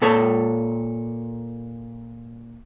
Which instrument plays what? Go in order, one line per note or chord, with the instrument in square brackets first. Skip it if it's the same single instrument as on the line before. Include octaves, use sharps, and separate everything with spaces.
[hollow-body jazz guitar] A#2 A4 C#5